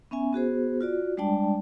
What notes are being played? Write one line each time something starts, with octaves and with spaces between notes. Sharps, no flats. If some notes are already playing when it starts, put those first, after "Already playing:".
B3 C#4 E5 G#5
B3 F#4 G#4 C5
F4 F#4 D5
G3 G#3 D4 D5 G5 A5